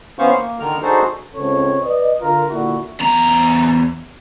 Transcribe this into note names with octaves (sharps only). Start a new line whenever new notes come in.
E3 B3 C#4 C5 F5 C#6
A#3
D3 D#3 A#4 F6
D4 D#4 F#4 G#4 A4 C5
C#2 C4 A4 C#5
B4 D5 D#5
D3 F4 A#4
A#2 D3 E4 F#4
E2 A#5